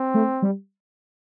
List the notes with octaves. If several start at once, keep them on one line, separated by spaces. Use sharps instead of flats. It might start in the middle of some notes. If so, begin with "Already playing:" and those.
Already playing: C4
A3
G3